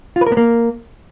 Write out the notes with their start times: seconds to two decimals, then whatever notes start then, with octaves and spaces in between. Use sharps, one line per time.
0.16 F4
0.21 B4
0.26 A#4
0.32 B3
0.37 A#3